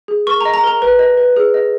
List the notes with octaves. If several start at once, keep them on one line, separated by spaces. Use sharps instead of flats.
G#4
A#4 C#6
A#5
D#5
A#5
A#4 A#5
B4
D#5
B4
G#4
D#5